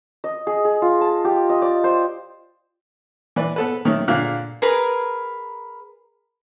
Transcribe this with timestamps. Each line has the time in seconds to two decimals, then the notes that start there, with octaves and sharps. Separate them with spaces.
0.24 D#5
0.47 G#4
0.65 G#4
0.82 F4
1.01 A5
1.25 G4
1.49 D#5
1.62 D5
1.84 C5
3.36 E3 B4 D5
3.56 B3 A4 B4
3.85 D#3 F#3 A3 C#4
4.08 A#2 D3 F5 F#6
4.62 G#4 A#4 B4